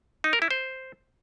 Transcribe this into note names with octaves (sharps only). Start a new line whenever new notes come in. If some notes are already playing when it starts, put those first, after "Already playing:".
D#4
A#4
E4
C5